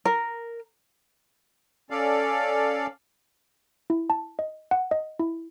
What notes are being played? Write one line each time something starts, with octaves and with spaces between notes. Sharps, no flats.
A#4
C#4 A4 D5 F5
E4
A5
D#5
F#5
D#5
E4